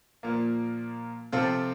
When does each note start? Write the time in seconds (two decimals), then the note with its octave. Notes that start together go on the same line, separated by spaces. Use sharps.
0.23 A#2 F3 A#3
1.32 C3 F3 C4 F4 A4